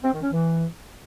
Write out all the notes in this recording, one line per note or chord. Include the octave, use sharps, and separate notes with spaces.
C4
D#3
C#4
E3